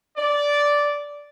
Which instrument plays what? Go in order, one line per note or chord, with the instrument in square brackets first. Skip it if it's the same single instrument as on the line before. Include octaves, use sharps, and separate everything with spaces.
[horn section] D5